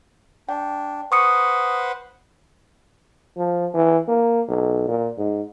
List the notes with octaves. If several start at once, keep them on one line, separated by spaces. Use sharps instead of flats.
D4 G5
B4 C5 F#5 C#6 D#6 C#7
F3
E3
A#3
B1
A#2
G#2